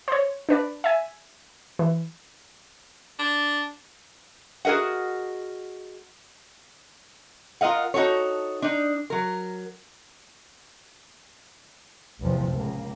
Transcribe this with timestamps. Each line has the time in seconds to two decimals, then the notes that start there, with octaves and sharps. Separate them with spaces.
0.08 C5 C#5
0.49 D4 B4 D5
0.84 E5 G#5
1.79 E3
3.19 D4
4.65 F#4 G#4 A#4 D#5 F#5
7.61 F4 A#4 D#5 F5 F#5
7.94 D#4 F#4 A4 C#5
8.62 D4 D#4
9.10 F#3 A#4
12.21 A1 E2 G#2 C3 F3
12.51 C#2 A#3